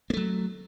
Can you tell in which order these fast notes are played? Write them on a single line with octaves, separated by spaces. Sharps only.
A#3 A3 F#3